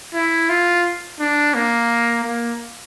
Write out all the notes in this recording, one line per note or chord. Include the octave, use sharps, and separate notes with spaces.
E4
F4
D4
A#3
A#3